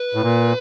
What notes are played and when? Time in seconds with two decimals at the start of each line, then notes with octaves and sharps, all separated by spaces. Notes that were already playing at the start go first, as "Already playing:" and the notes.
Already playing: B4
0.14 A2
0.22 A#2